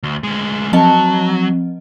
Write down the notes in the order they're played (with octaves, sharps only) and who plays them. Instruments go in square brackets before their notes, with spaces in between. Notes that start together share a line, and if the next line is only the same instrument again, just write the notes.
[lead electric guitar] D2
D2 G#3
[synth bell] F3 C4 D#5 [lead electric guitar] F#3 [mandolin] A5